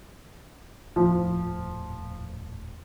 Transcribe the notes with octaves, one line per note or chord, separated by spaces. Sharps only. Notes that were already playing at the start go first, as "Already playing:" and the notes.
D#1 F2 A2 F3